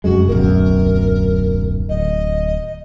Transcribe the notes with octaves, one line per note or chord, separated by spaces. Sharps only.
F1 F#2 G#3 F#4
D1 B1 F#2 A#4
D1 D#5